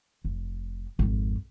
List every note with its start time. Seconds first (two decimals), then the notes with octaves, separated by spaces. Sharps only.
0.25 F1
0.99 G#1 F2